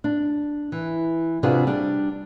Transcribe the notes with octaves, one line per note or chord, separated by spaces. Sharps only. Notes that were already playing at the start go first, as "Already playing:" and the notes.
D4
E3
C3 D4 F4 F#4 G#4 B4
G3 D4